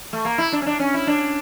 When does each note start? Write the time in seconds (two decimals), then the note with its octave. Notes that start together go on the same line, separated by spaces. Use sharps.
0.13 A3
0.25 A#3
0.38 E4
0.52 D4
0.62 C#4
0.66 D4
0.79 C#4
0.94 E4
1.07 D4